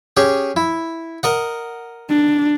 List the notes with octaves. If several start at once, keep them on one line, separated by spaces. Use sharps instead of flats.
C#4 G4 G#4
E4
A#4 D#5 F#5
D4